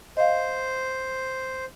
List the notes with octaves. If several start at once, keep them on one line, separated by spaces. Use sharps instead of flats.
C5 D#5 F5